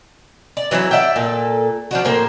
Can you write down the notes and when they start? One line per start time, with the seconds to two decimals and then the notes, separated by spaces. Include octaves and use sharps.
0.57 D5
0.71 E3 F#3 D#4 E4
0.91 D5 E5 F#5 G5
1.16 A#2 A4
1.91 F3 D4 F#4
2.05 A2 A#3 C5